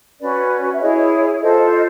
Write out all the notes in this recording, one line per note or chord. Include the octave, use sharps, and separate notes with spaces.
C#4 F#4 B4 D5
E5
E4 G#4 C#5 D#5
F4 A4 C5 D#5
D#5